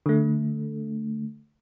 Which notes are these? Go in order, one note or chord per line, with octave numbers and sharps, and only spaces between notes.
D3 A3